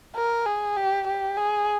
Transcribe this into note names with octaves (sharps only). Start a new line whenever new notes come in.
A#4
G#4
G4
G4
G#4